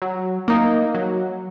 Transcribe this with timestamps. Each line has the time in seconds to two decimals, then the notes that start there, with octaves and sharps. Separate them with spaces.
0.02 F#3
0.48 A#3 D#4
0.94 F#3